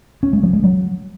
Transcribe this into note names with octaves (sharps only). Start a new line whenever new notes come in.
C#4
G#3
F3
G#3
F#3